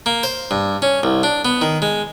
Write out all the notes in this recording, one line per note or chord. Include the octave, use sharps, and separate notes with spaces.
A#3
C5
G2
C#4
C2
D4
B3
D#3
G#3